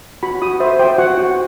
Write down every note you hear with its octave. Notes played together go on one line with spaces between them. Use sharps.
F#4 B5
F#4 D#6
C5 E5
C5 G5
F#4 F#5
F#4